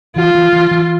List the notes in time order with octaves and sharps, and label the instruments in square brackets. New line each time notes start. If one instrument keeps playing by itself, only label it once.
[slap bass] E3 [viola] F4
[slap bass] E3
E3
E3